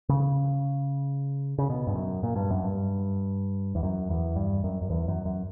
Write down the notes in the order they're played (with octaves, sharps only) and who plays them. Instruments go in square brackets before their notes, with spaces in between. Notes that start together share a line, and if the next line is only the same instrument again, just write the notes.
[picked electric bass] C#3
C#3
B2
G2
F#2
A#2
G2
F#2
G2
E2
F#2
E2
G2
F#2
F#2
E2
F#2
F#2